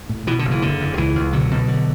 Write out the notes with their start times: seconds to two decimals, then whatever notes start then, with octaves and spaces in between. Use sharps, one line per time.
0.09 A2
0.27 B2 E3
0.39 D3
0.45 F#1
0.51 E3
0.62 F#1 D3
0.80 E2
0.97 C#2 E3
1.15 C#2
1.33 B2 D3 F#3
1.51 B2
1.68 D3